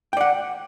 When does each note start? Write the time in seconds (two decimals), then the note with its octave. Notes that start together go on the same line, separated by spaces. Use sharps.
0.13 G5
0.17 D5
0.21 F#5